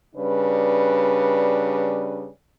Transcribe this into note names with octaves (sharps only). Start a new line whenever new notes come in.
C#3 G3 D4 B4